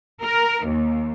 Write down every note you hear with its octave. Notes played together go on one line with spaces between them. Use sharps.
A#4
D#2